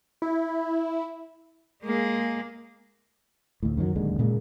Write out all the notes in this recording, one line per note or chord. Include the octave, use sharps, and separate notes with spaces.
E4
G#3 A#3 G#4
D2 A2
F#2 D#3 F3 F#3
D1 D#2 D3 G#3
A#2 C#3 G#3 A#3